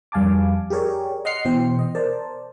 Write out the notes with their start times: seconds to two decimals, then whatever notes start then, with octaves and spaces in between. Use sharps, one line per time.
0.12 F2 G3 F5 G#5 A5 D6
0.70 G4 G#4 A#4 C#5 D5
1.25 D#5 F#5 C6 F6 C7 C#7
1.45 B2 E3 C5 G5
1.79 D#5
1.95 A#4 C5 D5 A5